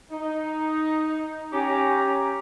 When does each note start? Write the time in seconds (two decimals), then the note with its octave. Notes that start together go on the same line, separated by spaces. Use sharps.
0.11 D#4
1.52 C#4 G4 A#5